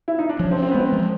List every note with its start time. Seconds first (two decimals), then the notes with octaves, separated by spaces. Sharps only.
0.08 E4
0.19 D#4
0.29 D4
0.39 F3 C#4
0.51 C4
0.57 C#4
0.63 C4
0.71 G#3 B3
0.80 C4
0.92 F3